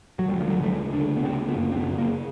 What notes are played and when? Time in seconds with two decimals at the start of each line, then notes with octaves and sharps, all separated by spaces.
0.19 F#3
0.29 D2 G3
0.40 F3
0.50 F#3
0.61 C#3 A3
0.72 G#3
0.92 D2 D4
1.17 B3
1.24 C#3 C4
1.48 B3
1.56 F#2 A#3
1.72 C4
1.77 B3
1.88 C#3
1.98 A#3